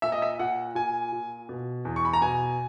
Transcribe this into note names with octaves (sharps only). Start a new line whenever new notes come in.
A#2 E5
D#5
E5
A#2 F#5
A#2 G#5
A#2
B2
E2
C#6
B5
A#5
B2 G#5